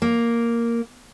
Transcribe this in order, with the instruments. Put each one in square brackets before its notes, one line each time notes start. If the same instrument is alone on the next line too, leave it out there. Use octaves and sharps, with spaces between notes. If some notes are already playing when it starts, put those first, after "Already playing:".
[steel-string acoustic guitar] A#3